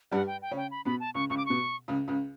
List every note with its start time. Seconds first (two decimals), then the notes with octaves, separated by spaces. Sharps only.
0.11 G2 G3 F#5
0.27 G5
0.42 G5
0.51 C#3 C#4
0.57 G5
0.71 B5
0.85 B2 B3 B5
1.00 A5
1.14 C#2 C#3 C#6
1.30 C#2 C#3 C#6
1.37 D6
1.46 B2 C#6
1.88 C#2 C#3
2.08 C#2 C#3